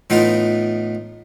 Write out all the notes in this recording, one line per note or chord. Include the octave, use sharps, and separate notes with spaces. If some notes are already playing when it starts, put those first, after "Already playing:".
A2 E3 B3 D#4 F4